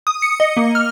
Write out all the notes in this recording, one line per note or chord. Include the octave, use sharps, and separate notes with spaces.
D#6
C#7
D#5
A#3
F6